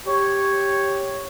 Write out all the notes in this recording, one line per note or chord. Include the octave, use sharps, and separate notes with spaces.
G4 C#5